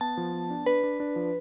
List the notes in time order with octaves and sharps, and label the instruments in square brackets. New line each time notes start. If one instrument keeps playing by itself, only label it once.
[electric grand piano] B3 [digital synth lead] A5
[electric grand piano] F3
B3
D4
[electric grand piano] D4 [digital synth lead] B4
[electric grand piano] D4
D4
F3